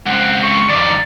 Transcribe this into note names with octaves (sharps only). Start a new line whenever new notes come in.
C#2 C4 F#5
C#6
F2 D#3 D5